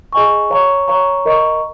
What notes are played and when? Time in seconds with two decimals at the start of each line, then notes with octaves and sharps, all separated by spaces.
0.13 G#4 D#5 G#5 C#6
0.50 C#5 F5 A#5 C#6
0.88 C#5 F5 A#5 C#6
1.26 A#4 D#5 A#5 C#6